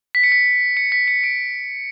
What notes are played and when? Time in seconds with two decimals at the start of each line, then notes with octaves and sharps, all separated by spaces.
0.15 B6
0.23 C#7
0.32 B6
0.77 C#7
0.92 B6
1.08 C#7
1.24 D7